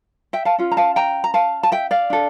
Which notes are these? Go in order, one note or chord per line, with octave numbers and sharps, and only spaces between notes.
E5 G5
F5 A5
C#4 F4
A#5
F5 A5
G5 A#5
A#5
F5 A5
A5
E5 G5
D5 F5
D4 A4